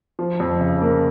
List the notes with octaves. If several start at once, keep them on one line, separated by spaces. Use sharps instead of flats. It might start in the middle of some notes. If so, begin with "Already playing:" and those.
F3
F2
C#3
A#3